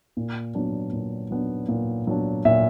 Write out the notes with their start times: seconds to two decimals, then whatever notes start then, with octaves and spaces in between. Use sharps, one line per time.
0.17 A#2
0.55 F#3 B3 D4
0.93 A#2
1.31 F#3 B3 D4
1.68 A#2
2.07 F#3 B3 D4
2.45 A#2 E5